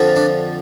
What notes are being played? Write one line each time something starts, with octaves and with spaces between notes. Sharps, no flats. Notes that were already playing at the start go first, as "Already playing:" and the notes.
Already playing: F2 D3 F3
D4